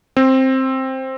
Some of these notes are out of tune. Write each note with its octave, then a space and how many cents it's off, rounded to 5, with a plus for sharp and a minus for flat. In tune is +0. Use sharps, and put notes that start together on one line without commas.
C4 +10